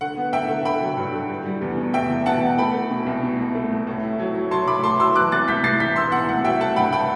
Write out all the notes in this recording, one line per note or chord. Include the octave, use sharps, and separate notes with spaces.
D3 F#5
B3
D3 E5 G5
D3
D3 G5 B5
F#3
G2
D3
G3
G3
E2
B2
E2 E5 G5
E2
B2 F#5 A5
E2
A3 G5 B5
A3
B2
C2
B2
C2
A3
C2
A2
E4
F#3
F#3
F#3 A5 C6
A2 B5 D6
A2 A5 C6
F#3 C6 E6
E3 D6 F#6
C2 F#6 A6
C2 G6 B6
C2 A6 C7
E3 G6 B6
E3 C6 E6
B3 F#5
C2 F#5
F#3 E5 G5
A3 F#5 A5
G2 G5 B5
G5 B5